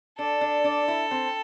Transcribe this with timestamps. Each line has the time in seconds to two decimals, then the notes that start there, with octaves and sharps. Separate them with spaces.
0.19 D4 A4
0.41 D4
0.64 D4
0.88 E4
1.11 C4